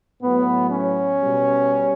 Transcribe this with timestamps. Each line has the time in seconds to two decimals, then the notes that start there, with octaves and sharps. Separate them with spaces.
0.23 A2 F#3 B3
0.71 C#4
1.21 B2 G3